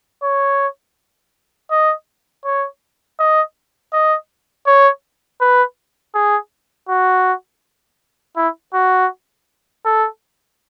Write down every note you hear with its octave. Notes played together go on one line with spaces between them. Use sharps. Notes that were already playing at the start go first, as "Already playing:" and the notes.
C#5
D#5
C#5
D#5
D#5
C#5
B4
G#4
F#4
E4
F#4
A4